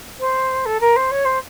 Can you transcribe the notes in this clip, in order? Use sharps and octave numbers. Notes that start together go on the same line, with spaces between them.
C5
A4
A#4
C5
C#5
C5